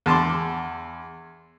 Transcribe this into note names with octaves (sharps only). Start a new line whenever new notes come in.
E2 A5 C6 D6